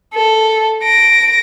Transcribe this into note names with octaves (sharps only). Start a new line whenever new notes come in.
A4
A#6 D7